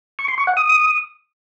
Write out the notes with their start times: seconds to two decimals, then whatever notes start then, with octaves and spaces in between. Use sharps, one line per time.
0.19 C#6
0.28 C6
0.38 C#6
0.47 F#5
0.57 D#6